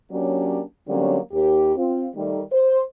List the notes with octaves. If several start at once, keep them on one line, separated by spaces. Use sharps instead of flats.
F#3 A#3 C#4 D4 G4 D5
D3 F#3 G3 A#3 C4 C#4
D#2 G4
C4 F4
D#3 G3 A3
C5